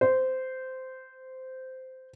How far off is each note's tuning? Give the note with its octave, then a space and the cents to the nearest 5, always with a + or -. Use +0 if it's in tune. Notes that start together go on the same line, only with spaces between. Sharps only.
C5 -15